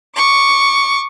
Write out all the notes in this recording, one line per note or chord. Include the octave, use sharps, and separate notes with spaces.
C#6 D6